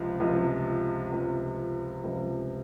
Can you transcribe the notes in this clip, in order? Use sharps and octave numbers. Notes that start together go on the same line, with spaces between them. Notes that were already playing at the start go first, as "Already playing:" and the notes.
Already playing: C#2 C3 F3
C#2 C3 F3
C#2 C3 F3
C#2 C3 F3